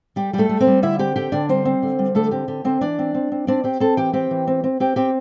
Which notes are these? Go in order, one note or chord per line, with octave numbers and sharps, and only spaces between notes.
G3 G4
G3 A3 G4 A4
G3
C4 C5
G3
D3 E4 E5
C4 G4 G5
D3 G4 G5
D3 D4 D5
G3 C4 C5
C4
D3
G3
D3 A3 A4
C4 G4
D3 G4
D3 C4 C5
E3 D4 D5
C4
C4
C4
C4 D4 D5
C4 G4 G5
C4 A4 A5
E3 G4 G5
C4 G4 G5
E3
C4
C4
C4 G4 G5
C4 G4 G5